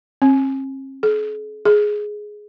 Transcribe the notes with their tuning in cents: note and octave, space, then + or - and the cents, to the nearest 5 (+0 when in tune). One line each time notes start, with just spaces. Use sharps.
C4 +45
G#4 +45
G#4 +5